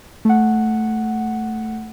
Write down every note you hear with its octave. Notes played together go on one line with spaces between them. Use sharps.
A3 F#5